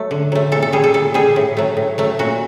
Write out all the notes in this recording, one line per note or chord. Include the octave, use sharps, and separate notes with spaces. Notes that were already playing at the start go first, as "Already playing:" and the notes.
Already playing: F#3 A3
D3
F#3 A3
A#2 A4
A4
G3 G#4
A4
A#2 A4
G3 G#4
A2
F#3 A3
A2
F#3 A3
A#2 F#4